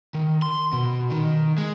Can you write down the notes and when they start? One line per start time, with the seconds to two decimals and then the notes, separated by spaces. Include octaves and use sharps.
0.14 D#3
0.42 C6
0.73 B2
1.10 D#3
1.58 G#3